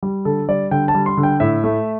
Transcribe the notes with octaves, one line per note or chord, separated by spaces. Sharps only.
G3
D3 A4
G3 D5
D3 G5
A5
G3
C6
D3
G5
A2 E5
A3